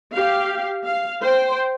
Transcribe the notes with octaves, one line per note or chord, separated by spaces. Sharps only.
G4 F5
F5
C5 G5